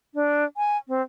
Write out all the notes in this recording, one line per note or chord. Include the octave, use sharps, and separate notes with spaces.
D4
G#5
C4